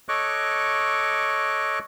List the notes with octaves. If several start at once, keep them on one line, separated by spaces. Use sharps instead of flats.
A4 C#5 D#5 C#6 D6 F#6